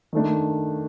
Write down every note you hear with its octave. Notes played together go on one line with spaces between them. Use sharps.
D#3 A3 D4